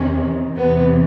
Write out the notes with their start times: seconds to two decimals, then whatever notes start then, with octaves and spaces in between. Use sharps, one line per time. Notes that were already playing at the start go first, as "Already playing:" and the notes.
Already playing: E2 C3 D#3 C#4
0.58 E2 C3 E3 B3